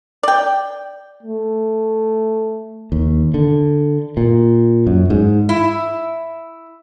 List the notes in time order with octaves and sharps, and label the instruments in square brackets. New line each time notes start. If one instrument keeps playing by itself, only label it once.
[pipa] D5 G5
[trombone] A3
[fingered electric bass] D#2
D3
A#2
F#2
G#2
[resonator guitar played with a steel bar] E4